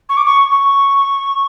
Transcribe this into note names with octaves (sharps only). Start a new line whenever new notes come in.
C#6
D6
C#6
C#6